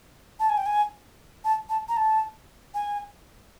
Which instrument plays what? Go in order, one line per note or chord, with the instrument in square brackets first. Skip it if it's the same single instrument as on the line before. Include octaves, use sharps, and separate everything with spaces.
[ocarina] A5
G#5
G5
G#5
A5
A5
A#5
A5
G#5